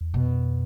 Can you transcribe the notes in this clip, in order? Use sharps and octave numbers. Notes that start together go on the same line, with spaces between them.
E2
F2 B2